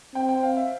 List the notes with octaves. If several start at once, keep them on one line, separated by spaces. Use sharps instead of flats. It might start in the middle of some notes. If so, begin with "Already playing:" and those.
C4 G5
G5
F5
E5